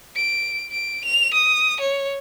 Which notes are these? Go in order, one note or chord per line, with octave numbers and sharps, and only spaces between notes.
D7
D7
F7
D#6
C#5